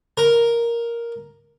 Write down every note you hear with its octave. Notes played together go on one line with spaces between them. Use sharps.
A#4